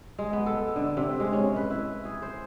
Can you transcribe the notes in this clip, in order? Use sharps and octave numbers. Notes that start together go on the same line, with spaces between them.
G#3
B3
A4
D3
C3
G#3
C#4
B4
E4
G#4
C5